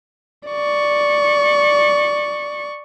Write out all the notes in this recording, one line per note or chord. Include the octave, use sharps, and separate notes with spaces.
D5 C#6